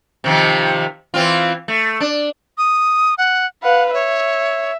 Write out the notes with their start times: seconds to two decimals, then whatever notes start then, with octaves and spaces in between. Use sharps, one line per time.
0.24 C3 D#3 F3
1.14 E3 C4 F4
1.68 A3
2.00 D4
2.58 D#6
3.18 F#5
3.63 B4 F5 F#5
3.93 C#5 E5